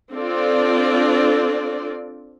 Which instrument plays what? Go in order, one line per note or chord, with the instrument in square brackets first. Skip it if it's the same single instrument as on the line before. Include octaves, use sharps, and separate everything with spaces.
[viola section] C4 D4 F4 A4 D5